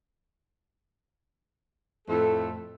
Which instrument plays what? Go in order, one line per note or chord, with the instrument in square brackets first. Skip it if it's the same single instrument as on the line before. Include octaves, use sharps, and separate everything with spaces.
[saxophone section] F2 A2 A3 A4